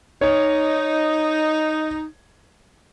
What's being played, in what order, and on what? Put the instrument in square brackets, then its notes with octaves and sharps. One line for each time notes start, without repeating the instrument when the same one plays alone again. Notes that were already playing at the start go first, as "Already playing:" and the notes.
[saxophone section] D#4 [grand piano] C#5